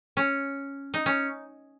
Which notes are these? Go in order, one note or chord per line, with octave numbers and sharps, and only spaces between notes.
C#4
D#4
C#4